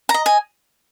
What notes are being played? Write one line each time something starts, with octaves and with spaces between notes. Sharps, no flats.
A#5
D#5
G#5